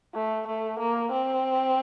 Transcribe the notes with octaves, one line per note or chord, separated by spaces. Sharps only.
A3
A3
A#3
C4